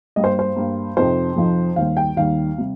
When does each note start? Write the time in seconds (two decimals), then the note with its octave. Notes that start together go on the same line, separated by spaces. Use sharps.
0.16 G2 G3 A#3 D#5
0.24 C5
0.39 C5
0.56 G2 G3 A#3
0.97 F2 C3 F3 D#4 C5
1.36 F2 C3 F3 D#4
1.76 D#2 D#3 G3 F5
1.97 G5
2.17 D#2 D#3 G3 F5
2.58 C3 G3